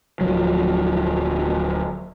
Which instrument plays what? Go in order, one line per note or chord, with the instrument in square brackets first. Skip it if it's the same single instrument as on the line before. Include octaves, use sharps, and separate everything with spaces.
[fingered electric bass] D1 F3 F#3